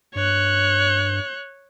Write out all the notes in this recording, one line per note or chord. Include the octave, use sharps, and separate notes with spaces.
G2 C#5 F#6